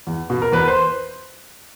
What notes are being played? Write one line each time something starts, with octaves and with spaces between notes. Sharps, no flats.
E2
B2
A#4
E2 B4
C5